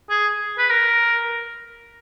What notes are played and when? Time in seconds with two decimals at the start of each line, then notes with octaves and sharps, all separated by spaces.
0.10 G#4
0.59 B4
0.70 A#4